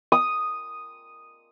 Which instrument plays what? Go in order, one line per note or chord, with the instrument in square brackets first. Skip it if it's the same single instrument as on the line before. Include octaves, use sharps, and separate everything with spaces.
[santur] D#6